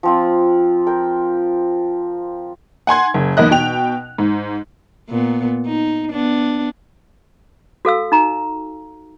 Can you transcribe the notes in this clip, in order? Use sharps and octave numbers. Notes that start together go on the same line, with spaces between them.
F3 C4 F4
A#4 G5
F#5 G#5 C6 G#6
F#1
B1 E2 A#3 D#5 F#6
B2 G5 F7
G#2
A#2 B3
D#4
B3 D4
F#4 A4 F5 E6
D#4 A#5